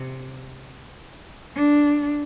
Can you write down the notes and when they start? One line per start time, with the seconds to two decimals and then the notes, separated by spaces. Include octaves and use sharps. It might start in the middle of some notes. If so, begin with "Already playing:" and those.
Already playing: C3
1.56 D4